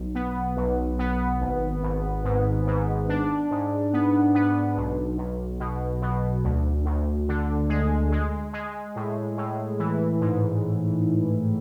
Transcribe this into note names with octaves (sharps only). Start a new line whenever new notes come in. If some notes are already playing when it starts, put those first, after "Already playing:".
Already playing: B1
B3
B1
B3
G#1
G#1
G#2
G#2
D4
G#2
B3
B3
B1
B1
B2
B2
D2
D2
D3
G#3
G#3
G#3
A2
A2
E3
G#2